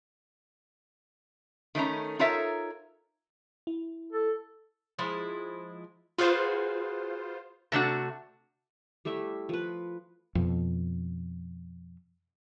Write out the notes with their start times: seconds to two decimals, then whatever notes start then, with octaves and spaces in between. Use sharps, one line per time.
1.75 D#3 A3 C#4 A#5
2.19 D#4 F4 A4 A#4 C#5 E5
3.67 E4
4.13 A4
4.99 F3 G#3 E4
6.18 F4 F#4 G#4 B4 C5
7.72 C3 A3 D4 F#4
9.05 G3 A3 E4 E5
9.49 F3 B4
10.35 F2 B2